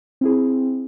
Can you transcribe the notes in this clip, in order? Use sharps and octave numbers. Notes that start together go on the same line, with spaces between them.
C4 E4 G#4